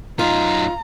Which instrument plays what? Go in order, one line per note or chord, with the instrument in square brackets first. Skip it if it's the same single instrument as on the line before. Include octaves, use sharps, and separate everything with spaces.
[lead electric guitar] F#2 D#4 [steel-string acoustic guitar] F4 [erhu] A#5